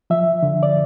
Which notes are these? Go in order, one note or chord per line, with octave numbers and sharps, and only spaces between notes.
F3 E5
D3
D5